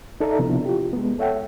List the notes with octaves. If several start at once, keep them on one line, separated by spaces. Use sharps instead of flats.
D#4 A4 D5 E5 A#5
C3 F3 B3 D4 E4
F4 G4
G#3 B3
A4 C#5 E5 F#5 G5